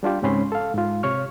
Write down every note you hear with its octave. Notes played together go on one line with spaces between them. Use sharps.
G3 D4 F4 G4
C#2 G#2 C4 C#4 B5 C6
A4 F5
G#2 F4
C3 C#5 C#6 F6